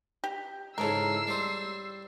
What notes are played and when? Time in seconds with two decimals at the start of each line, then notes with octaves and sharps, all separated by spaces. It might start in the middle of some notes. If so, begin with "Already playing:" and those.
0.24 G4
0.78 G#2 C#3 E3 A4 A#4 E6 C7
1.27 G3 C5